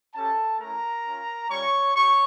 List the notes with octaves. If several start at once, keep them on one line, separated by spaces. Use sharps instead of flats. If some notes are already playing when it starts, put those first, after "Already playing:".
C#4 G4 A4 A5
A3 C#4 E4 A#4 A#5
C#4 F4
G3 C#4 F4 C#5 C#6
G4 C#5 C#6